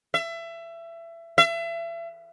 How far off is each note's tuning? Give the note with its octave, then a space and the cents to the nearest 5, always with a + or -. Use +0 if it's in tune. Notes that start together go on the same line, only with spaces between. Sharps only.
E5 +25
E5 +35